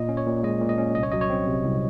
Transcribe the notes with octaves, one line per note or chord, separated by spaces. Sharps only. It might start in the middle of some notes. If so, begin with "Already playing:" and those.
Already playing: A#2 D#5
C#4
C#5
A#2
G#3 D#5
A#2
D#5
C#4
C2 D#5
C#5
F#3 D#5
C#5
C4
C3
C2